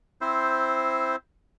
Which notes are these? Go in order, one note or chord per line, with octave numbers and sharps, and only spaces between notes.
C4 E4 C5